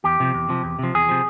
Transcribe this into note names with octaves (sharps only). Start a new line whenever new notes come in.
E2 G4
C3 F3
E2
C3 F3
E2
C3 F3
E2 G#4
C3 F3